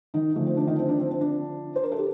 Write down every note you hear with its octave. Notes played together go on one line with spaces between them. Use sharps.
D#3 D#4
D3 F3 A3
C4
D4
D#3 D#4
C4
D4
C4
C4
D4
C5
A#4
A4
G4